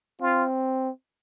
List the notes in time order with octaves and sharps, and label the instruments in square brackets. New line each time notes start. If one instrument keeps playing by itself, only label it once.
[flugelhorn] C4 [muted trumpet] F4